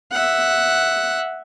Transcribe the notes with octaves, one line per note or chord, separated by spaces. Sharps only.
E5 F#5